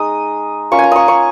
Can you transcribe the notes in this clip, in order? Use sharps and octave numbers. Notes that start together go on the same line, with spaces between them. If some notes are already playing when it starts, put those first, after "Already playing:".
Already playing: G#3 D#4 D#6
A#3 C#4 F4 C#6
G#5 A#5
C#6 D#6
C#6